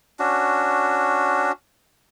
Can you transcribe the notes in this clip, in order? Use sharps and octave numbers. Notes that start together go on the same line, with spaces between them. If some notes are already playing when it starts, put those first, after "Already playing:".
C#4 D4 F#4